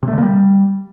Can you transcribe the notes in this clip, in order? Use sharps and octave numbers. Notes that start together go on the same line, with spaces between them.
C3
A3
D3
A#3
G3